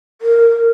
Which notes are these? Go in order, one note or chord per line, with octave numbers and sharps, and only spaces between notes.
A#4